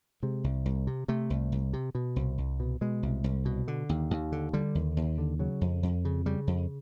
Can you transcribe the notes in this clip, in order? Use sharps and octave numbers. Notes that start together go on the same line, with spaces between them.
C3 G#3
C2
C2
C3
C3 A3
C2
C2
C3
B2
C2
C2
B2
B2 G#3
C2
C2
B2
D3
D#2
D#2
D3
D3 G3
D#2
D#2
D3
C#3 F#3
F2
F2
C#3
C#3 G3
F2